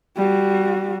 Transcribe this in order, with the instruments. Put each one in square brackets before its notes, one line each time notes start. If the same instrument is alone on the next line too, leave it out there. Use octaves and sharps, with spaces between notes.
[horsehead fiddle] G3 F#4